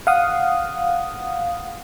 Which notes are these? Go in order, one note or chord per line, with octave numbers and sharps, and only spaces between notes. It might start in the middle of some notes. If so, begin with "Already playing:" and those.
F5 F#5 D#6